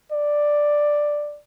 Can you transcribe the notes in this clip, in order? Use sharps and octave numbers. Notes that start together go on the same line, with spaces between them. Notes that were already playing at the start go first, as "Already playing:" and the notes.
D5